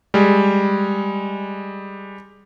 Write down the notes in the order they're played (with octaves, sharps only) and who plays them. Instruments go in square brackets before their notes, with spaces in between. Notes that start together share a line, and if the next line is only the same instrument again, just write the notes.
[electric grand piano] G3 G#3